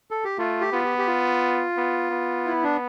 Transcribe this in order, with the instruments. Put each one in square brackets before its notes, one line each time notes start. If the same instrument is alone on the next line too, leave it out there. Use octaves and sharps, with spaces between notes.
[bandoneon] A4
G4
[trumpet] A3 [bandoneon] F4
[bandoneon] G4
[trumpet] B3 [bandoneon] F4
[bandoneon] G4
G4
F4
[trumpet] B3
B3
[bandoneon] E4
D4